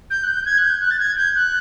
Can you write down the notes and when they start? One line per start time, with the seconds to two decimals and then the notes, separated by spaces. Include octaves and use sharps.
0.10 G6
0.23 F#6
0.28 G6
0.45 G#6
0.58 F#6
0.64 G6
0.81 F#6
0.90 A6
0.99 G#6
1.16 G6
1.35 F#6